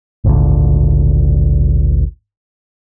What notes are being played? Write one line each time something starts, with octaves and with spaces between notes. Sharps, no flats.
G#1 D2 A#2 D3